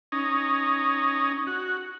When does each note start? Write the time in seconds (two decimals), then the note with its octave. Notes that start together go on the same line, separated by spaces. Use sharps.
0.12 C#4 D#4
1.47 F#4